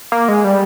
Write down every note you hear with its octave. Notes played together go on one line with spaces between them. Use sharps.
A#3
G#3
G3